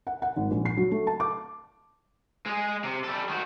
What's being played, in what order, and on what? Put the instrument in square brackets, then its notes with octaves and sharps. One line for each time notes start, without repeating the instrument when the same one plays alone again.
[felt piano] F#5
F#5
G#1
A#1
C7
F#3
A3
A5
D6
[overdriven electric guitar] G#3 G#4
C3
G3 A4
D#3 F#4